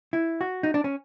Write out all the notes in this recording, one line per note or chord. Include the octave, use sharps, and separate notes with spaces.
E4
F#4
D#4
D4
C#4